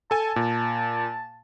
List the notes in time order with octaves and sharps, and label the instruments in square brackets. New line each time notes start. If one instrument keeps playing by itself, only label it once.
[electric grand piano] A4 G#5 [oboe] A5
[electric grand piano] A#2